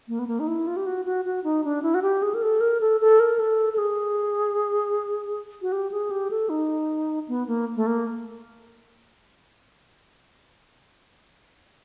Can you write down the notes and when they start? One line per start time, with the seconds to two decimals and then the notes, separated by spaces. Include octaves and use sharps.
0.08 A#3
0.19 B3
0.27 A#3
0.40 D#4
0.48 E4
0.67 F4
0.77 G4
0.86 F#4
1.05 F#4
1.25 F#4
1.44 D#4
1.65 D4
1.83 E4
1.94 F#4
2.02 G4
2.22 G#4
2.34 A#4
2.42 A4
2.61 A#4
2.81 A4
3.01 A4
3.20 A#4
3.39 A4
3.73 A4
3.78 G#4
5.62 F#4
5.72 G4
5.92 G#4
6.11 G4
6.31 A4
6.49 D#4
7.28 B3
7.47 A#3
7.76 A3
7.87 A#3